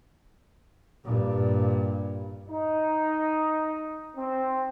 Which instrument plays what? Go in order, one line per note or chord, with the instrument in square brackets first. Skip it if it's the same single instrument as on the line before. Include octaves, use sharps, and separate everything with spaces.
[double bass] G2 A#2
[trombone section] D#4
C4